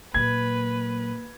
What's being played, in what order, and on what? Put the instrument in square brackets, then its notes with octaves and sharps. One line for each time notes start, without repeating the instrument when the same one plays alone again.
[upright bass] A#2 F#3 [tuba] A#3 [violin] B4 [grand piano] G#6